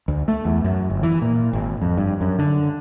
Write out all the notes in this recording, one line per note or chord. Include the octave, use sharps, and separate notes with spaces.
D2
A3
E2
F#2
G1
E3
A#2
G#1
F2
G2
F#2
D3